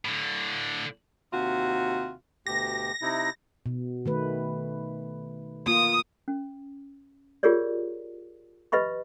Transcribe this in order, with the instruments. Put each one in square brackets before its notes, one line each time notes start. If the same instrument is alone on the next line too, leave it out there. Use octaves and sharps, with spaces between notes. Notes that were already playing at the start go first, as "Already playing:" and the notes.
[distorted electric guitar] A2 D3
[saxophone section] D#2 C3 F4 F#4
[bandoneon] D2 B2 G4 [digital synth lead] A#6
[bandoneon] C3 D#4 E4
[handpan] B2
D#3 A3 B4
[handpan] A#3 F4 [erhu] D#6
[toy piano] C#4
F4 G4 G#4 A#4 C#5 D5
G4 B4 D#5 E5 B5 C#6